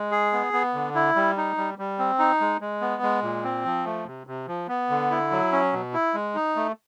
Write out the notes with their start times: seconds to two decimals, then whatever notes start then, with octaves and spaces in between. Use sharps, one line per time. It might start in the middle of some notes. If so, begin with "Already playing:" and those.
Already playing: G#3
0.11 G#4
0.33 B3
0.53 B3
0.74 D3
0.95 E4
1.16 G3
1.37 D#4
1.58 G3
1.79 G3
1.99 C4
2.19 D#4
2.41 G#3
2.61 G#3
2.81 B3
3.03 G#3
3.23 A#2
3.43 C4
3.65 F3
3.85 A3
4.06 C3
4.27 C3
4.48 F3
4.68 B3
4.90 D3
5.11 E4
5.31 F#3
5.52 C#4
5.73 B2
5.94 E4
6.14 G#3
6.35 D#4
6.56 A3